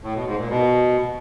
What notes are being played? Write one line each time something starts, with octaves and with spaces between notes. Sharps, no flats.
A2
B2
G#2
A#2
B2